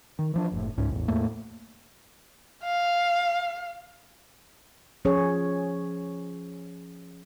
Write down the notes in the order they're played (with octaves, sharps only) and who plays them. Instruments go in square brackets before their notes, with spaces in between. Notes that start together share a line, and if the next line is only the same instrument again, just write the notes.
[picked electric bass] D#3
E3 F3 D4
F#1 A2
C#2 G#2 C#4
A1 E2
E2 A2 A3 A#3
[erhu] F5
[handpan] F3 C#4 G#4 C#5